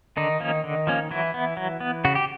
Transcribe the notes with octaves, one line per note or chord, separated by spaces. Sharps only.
D3 D#3 D#4
F3 A#3 C#4
D3
F3 A#3 C#4
E3 F#3 E4
B3
F#3
B3
C#3 F#4
G4